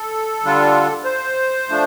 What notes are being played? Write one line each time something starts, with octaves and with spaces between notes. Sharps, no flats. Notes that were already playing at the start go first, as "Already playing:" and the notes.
Already playing: A4
D3 G3 D4 F4
C5
F3 A3 D4